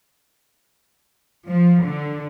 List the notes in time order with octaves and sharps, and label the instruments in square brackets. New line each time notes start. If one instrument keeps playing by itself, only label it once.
[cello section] F3
D3